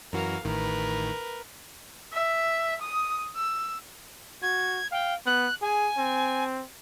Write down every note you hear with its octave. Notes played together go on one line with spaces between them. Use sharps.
F#2 E3 F#4 A#4 F5
A1 A2 D#3 A#4 B4
E5
D#6
E6
F#4 G#6
F5 G5
B3 F#6
G#4 G#5
C4